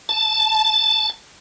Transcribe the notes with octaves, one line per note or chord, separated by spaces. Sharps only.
A5